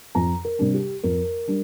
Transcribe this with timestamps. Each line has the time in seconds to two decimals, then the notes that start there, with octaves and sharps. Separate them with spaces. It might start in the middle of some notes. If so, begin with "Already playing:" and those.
0.15 F2 A#5
0.45 A#4
0.59 C3 G3 D4
0.74 G4
1.03 F2 A#4
1.48 G3 D4